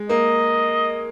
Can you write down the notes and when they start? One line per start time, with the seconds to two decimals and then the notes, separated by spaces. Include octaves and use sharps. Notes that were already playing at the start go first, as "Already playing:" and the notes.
Already playing: G#3
0.09 A#3 D#5